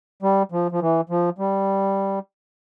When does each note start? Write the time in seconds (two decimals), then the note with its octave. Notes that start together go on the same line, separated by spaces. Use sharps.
0.22 G3
0.52 F3
0.72 F3
0.81 E3
1.09 F3
1.38 G3